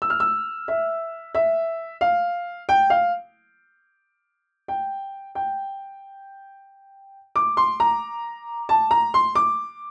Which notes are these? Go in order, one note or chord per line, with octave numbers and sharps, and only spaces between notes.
E6
F6
E6
E5
E5
F5
G5
F5
G5
G5
D6
C6
A#5
A5
A#5
C6
D6